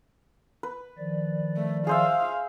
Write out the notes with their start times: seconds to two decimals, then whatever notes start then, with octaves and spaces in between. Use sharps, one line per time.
0.63 B4
0.98 D#3 F3 D5
1.57 A3
1.87 G#4 C5 E5 F5